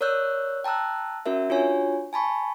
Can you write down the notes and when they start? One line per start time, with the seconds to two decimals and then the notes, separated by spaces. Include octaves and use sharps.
0.01 A#4 C#5 D5 E6 F#6 G6
0.64 G5 A5 A#5 E6 F#6
1.26 C#4 F#4 A#4 E5
1.49 D4 F4 F#4 C#5 G#5
2.13 G#5 A5 B5 C#6